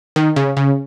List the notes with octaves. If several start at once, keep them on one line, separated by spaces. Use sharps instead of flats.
D#3
C#3
C#3